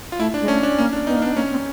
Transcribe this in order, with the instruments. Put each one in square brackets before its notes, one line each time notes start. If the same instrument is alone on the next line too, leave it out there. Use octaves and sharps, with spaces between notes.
[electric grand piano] F4
[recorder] A3 [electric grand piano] E4
[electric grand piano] D4
[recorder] G#3
[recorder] A3 [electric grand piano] C#4
[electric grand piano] D4
[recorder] A#3 [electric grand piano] C#4
[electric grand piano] D4
[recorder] B3 [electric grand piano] D#4
[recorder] A#3
[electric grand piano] D4
[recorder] B3
[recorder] A#3 [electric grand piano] C#4
[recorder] C4